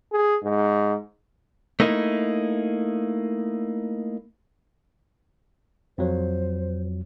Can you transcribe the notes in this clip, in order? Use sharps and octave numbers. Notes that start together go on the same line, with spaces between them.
G#4
G#2
A3 A#3 D#4 E4
F2 F#3 C5